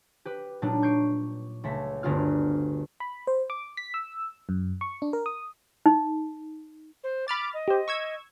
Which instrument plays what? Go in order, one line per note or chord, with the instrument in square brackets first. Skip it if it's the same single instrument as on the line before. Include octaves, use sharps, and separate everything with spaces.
[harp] G4 B4
A#2 F#3 G3 D4 D#4
C#6 G6 C7 D7
C#2 A3 B6
G1 D2 B3 F4 F6
[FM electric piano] B5
C5
D6
B6
E6
F#2
C#6
D4
A#4
D#6
[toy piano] D#4
[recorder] C5
[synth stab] B5 F6 A6 [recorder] D6
[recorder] D#5
[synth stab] G4 C5
C#6 E6 G#6